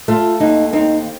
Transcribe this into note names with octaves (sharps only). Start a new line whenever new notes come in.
A3 F4
D#2 D#4
C4 D#4